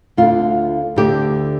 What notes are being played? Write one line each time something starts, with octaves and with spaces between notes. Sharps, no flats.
D2 D3 F4
D2 D3 G4